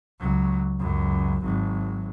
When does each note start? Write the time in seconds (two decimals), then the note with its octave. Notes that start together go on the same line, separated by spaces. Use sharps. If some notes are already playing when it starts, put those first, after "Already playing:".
0.20 C#2 F#3
0.80 C#2 F#2
1.44 G#1 F#3